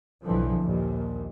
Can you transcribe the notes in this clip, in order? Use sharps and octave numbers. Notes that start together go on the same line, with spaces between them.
B1 F2 A2 D3 E3 F3
A#1 D#2 A#2